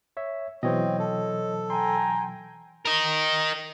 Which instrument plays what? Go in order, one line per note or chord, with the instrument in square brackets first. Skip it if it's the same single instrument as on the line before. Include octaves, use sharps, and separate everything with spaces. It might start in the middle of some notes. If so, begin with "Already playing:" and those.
[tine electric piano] C#5 E5
[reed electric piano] B2 E3 F#3 [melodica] C4 [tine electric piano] C5 C#5 D#5
[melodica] A4
[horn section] G5 G#5 A#5 [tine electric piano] C6
[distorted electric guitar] A#4 D#5